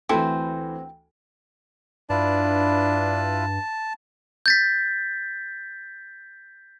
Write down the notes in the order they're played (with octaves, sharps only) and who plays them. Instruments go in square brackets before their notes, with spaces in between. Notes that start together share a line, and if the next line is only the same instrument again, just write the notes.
[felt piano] D2 E3 [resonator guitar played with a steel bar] C4 F#4 B4 [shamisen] E4 A4 [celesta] G5
[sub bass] G2 [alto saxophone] D4 [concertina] E4 F4 B4 [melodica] A5
[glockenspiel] G6 A6 B6